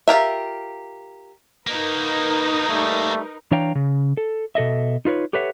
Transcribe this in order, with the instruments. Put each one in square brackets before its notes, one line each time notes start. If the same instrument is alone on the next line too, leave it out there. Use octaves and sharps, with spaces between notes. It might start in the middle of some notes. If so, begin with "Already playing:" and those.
[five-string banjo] F4 G4 A#4 E5
[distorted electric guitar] A#3 F#4 [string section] D#4 A#4 B4
[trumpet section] G3 A3
[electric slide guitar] E3 D4 C#5 F5 G5 A#5
C#3
A4
B2 A4 D#5 E5
D#4 F4 B4 C#5
G4 A4 B4 C#5 E5 F#5